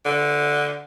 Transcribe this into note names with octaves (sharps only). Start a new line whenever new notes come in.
D3